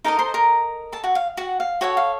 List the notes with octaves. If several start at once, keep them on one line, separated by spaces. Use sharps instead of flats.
D#4 A4 A#4 D#5 A#5
C5 C6
A#4 A#5
A4 A5
F#4 F#5
F5
F#4 F#5
F5
F#4 A4 C#5 F#5
F5